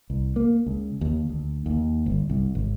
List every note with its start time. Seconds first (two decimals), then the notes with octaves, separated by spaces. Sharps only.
0.10 C2
0.36 A#3
0.66 C#2
1.01 D#2
1.29 D2
1.66 D#2
2.06 G1
2.30 C2
2.55 G#1